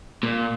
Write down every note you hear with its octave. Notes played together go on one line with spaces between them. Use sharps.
A#2